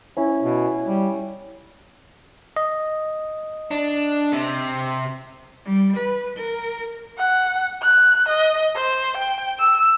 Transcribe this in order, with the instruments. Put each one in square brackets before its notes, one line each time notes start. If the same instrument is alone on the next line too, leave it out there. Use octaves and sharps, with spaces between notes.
[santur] C#4 E4
[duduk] B2
G3
[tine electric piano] D#5
[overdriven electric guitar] D4
C3
[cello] G3
B4
A#4
[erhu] F#5
F#6
D#5
C5
G5
E6